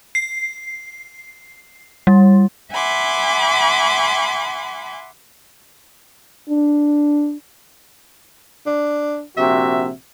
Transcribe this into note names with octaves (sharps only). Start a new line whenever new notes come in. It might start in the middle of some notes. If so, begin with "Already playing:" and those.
C7
G3
E5 F#5 G#5 B5 C6 D6
D4
D4
A#1 C3 F#4 E5